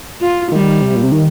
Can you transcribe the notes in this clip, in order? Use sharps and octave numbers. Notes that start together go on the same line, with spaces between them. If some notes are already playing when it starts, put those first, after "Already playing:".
F4
D#3 G3
C3
A#2
C3
D#3